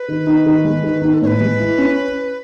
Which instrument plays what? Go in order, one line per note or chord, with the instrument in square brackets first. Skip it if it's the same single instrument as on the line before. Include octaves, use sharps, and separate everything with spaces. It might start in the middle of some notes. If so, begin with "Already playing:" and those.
Already playing: [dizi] B4
[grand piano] D#3
D#4
D#3
G#3
D#3
D#4
[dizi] A4
[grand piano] A2 [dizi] C#5
[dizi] B4
[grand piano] G#3
E4
C#4